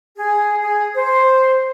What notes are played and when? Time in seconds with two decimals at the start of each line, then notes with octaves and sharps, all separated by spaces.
0.16 G#4
0.60 G#4
0.95 C5